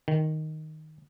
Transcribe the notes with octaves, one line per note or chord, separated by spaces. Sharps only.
D#3